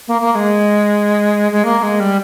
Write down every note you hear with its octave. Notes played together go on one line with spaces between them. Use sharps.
A#3
A#3
A#3
G#3
G#3
A#3
A#3
G#3
G3